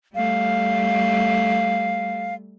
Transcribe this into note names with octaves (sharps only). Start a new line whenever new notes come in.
G3 A3 F5